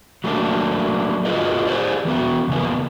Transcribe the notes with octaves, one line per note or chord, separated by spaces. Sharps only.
F#3 A3 A#3 D4
F4 F#4 G#4 A#4 B4 D#5
G4 G#4 C5 D5
E3 B3 F#4
E2 C#3 A#3 B3